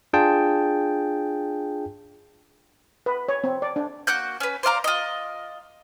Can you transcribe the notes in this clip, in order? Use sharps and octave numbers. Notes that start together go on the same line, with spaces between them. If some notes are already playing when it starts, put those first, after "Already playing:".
D4 F4 G#4 G5 A5
B4
C#5
C4
D5
D4
A#3 F#4 F#6 G6
C#4 B4
C5 D5 F5 A#5
F4 D#5